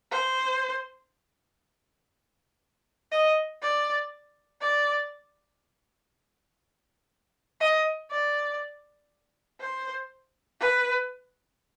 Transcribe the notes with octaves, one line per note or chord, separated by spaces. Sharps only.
C5
D#5
D5
D5
D#5
D5
C5
B4